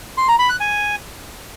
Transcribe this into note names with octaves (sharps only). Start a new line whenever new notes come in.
C6
A#5
B5
F#6
G#5